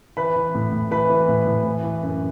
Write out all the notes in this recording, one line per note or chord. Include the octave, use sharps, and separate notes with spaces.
E3 B4 B5
E3
A2
A2
E3 B4 B5
E3
A2
A2
E3
E3
F#2